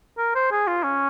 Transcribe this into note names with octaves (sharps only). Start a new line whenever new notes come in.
A#4
C5
G#4
F4
C#4